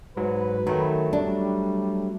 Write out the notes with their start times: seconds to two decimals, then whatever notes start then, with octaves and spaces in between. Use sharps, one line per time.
0.17 G#2 F#3 B4
0.67 D#3 F#3 A3
1.13 G3 D4